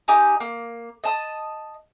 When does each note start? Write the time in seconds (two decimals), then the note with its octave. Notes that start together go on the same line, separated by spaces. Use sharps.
0.08 D#4 G4 G#5 A#5
0.40 A#3
1.04 D#5 A5 D#6